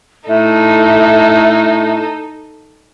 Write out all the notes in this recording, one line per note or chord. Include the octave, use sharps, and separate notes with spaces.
A2 D#4 A4 E5